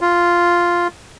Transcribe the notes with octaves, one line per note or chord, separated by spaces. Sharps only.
F4